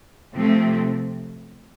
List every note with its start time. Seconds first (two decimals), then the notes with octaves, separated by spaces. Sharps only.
0.35 C3 F3 A3 C4